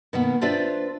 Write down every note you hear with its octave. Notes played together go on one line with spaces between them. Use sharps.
B2 D#3 A#3 B3
D4 F4 B4 C5 D5 E5